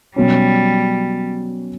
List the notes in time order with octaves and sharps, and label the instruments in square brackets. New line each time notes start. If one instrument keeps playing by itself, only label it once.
[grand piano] B2 F#3 C#4 [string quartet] G3